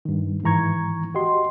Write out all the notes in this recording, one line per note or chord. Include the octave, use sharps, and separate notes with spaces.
G2 D#3
G#2 D#3 E3 A#5 C#6 G#6
F#4 G4 D#5 C6